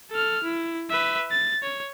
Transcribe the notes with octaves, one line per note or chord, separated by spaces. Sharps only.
A4 F6
E4
B4 E5
A6
C#5